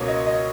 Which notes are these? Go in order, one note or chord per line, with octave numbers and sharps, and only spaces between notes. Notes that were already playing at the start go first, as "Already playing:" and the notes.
Already playing: C#2 B2 A#3 C#5
D#5
D#5